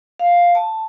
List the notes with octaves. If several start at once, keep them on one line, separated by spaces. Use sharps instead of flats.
F5
A5